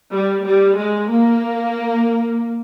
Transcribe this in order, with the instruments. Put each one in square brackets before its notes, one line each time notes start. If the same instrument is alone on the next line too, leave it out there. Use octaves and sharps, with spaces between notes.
[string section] G3
G3
G#3
A#3